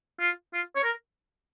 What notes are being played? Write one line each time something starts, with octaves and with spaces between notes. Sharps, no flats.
F4
F4
C#5
A#4